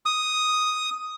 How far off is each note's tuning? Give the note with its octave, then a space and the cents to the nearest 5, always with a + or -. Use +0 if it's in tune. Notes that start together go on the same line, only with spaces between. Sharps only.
D#6 +0